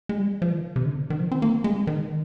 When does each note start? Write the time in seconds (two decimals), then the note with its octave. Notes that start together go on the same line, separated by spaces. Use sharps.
0.09 G#3
0.17 G3
0.42 F3
0.52 D#3
0.76 C3
0.85 D3
1.10 D#3
1.20 F3
1.32 C4
1.42 A#3
1.64 G#3
1.87 D#3